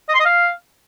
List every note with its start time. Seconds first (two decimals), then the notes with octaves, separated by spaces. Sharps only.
0.09 D#5
0.14 C6
0.20 D#5
0.26 F5